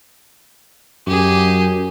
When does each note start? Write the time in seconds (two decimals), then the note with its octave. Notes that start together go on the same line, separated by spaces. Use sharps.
1.07 F#2 G4 G#4